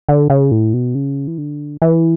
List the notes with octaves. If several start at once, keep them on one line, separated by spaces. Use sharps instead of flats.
D3
C#3
A2
B2
C#3
E3
D3
E3